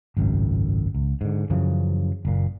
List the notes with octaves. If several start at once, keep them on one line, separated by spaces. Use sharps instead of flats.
G#1 C#2 F#2 A2
C#2
G#2 D3
F#2 C#3 E3 F3
F#1 A#2